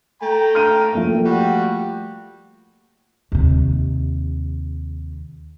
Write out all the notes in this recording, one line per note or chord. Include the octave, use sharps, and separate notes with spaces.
A3 G5 A#5
F6 D#7
F3 A3 A#3
G3 F#4 G5
D#2 C3